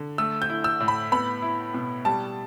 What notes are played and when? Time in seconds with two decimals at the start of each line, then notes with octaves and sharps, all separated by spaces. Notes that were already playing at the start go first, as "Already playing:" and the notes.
Already playing: D3
0.18 A3 E6
0.42 G6
0.50 E4
0.64 E6
0.80 A2
0.88 B5
1.12 B3 B5
1.42 E4
1.74 B2
2.05 G3 A5